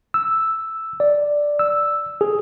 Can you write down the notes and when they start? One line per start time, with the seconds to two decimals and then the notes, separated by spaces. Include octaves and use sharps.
0.14 E6
1.00 D5
1.59 E6
2.21 G#4